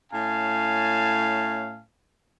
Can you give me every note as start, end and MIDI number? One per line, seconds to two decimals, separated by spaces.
0.12 1.81 45
0.12 1.81 61
0.12 1.81 77
0.12 1.81 80
0.12 1.81 81